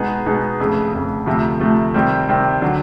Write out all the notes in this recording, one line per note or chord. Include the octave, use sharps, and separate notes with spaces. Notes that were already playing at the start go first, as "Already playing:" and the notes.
Already playing: B2 G#3 B3 D#4 G#4
B2 G#3 B3 D#4 G#4
F1 F2 C#3
F1 F2 C#3
D2 C3 F3 A3
D2 C3 F3 A3
C3 D#3 G3 C4
C3 D#3 G3 C4
D3 F#3